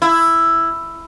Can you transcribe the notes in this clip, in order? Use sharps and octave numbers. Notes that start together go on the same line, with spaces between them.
E4